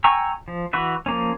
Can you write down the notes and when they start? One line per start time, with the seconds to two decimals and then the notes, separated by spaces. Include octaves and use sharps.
0.04 G5 G#5 A#5 C#6 E6
0.48 F3
0.73 E3 F#4 B4 E5
1.06 F3 A#3 C#4